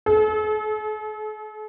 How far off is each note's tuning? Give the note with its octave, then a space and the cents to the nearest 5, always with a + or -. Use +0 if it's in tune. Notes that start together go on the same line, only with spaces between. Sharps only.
A4 -45